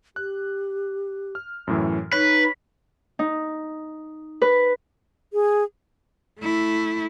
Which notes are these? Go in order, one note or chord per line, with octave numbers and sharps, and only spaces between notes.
G4 F#6
F6
F#2 A2 E3
D#4 B4 C#5 B6
D#4
B4
G#4
A3 E4